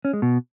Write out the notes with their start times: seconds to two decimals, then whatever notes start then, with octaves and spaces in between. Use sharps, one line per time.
0.05 C#4
0.13 G#3
0.22 B2